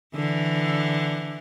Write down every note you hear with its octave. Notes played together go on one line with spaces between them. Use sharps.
D3 E3